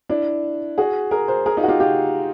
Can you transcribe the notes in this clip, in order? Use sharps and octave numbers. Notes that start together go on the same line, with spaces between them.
D4 E4
F#4 G#4
G#4 A#4
A#4 C5
G#4 A#4
D#4 F4
F#4
F4 G4
F4 G4